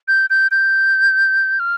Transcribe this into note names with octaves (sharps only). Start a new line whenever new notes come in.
G6
G6
G6
F6